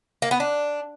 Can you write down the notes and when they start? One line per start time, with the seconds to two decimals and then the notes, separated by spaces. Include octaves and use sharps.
0.22 A#3
0.31 B3
0.40 D4